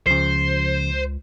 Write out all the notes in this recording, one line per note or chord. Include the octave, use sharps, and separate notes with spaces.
C#2 C#3 F3 C5